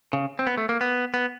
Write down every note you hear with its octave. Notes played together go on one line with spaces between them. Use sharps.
C#3
C4
B3
A3
A#3
B3
B3